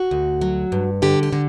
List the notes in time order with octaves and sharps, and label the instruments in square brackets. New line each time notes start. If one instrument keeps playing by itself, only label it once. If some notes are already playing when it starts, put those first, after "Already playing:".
Already playing: [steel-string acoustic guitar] F#4
D2
F#3
G2
D3 G4
G4
D3